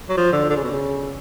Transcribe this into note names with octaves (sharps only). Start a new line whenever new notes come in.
F#3
F3
D3
D3
C#3
B2
C#3